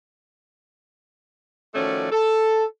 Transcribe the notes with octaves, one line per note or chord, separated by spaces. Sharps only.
D#3 F3 A3 C#4 F#4 D5
A4